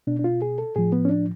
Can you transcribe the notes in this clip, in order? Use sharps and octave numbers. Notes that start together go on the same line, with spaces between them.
B2 D4
D4
F4
G#4
A4
A2 F3 G#4
B3
C#4
D4